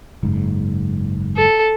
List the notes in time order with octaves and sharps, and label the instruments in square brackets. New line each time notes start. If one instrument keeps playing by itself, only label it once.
[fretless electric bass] F#1 G#2
[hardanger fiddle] A4